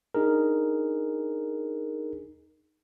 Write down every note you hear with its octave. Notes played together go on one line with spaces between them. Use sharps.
D4 D#4 G#4 A#4